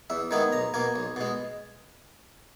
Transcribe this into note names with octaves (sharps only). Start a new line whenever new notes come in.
E2 E5
D#3 G#3 B3 G#5
B1 A#5
B2 A#3 G#5
B1
B2 G#3